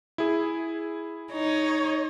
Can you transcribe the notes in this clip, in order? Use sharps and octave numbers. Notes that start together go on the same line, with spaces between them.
E4 G#4
D#4 C#5